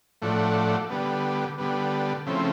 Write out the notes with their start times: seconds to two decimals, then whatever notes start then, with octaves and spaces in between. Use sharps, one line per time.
0.22 A2 F3 A3 D4 F#4
0.90 D3 G3 B3
1.58 D3 G3 B3
2.26 C#3 F3 A3 C4 E4